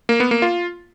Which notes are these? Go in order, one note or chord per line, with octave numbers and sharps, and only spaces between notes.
A#3
B3
A#3
F4